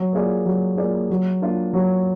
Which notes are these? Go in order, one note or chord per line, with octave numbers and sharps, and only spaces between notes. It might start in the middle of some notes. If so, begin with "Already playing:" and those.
Already playing: F#3
A#3 F4 G#4 D5
F#3
A#3 F4 G#4 D5
F#3
A#3 D4 F4
F#3